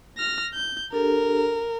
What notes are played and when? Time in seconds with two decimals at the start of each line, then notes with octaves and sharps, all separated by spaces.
0.18 F6 A#6
0.54 G6
0.92 D4 G4 A4 A#4